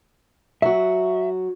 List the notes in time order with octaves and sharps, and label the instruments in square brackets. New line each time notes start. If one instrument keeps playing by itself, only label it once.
[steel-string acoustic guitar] F#3 F#4 [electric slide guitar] E5